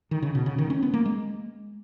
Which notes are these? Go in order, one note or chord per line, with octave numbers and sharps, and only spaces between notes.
D#3
C#3
B2
C#3
D#3
C#4
B3
A#3
G#3